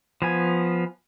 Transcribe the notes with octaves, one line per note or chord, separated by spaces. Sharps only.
F3 B3 G#5